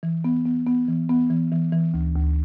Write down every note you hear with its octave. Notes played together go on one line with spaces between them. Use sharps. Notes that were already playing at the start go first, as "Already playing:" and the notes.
E3
B3
B3
B3
E3
B3
E3
E3
E3
D2
D2